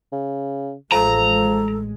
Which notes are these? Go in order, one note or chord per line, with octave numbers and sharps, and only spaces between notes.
C#3
A1 F3 G#3 A4 A#5